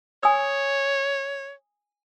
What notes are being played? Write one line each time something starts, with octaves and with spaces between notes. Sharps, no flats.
C#5 G#5 D#6 E6